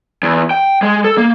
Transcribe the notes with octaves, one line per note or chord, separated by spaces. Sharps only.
E2
G5
G#3
A4
A#3